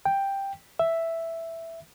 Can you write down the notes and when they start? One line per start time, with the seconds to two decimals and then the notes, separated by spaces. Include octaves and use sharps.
0.05 G5
0.79 E5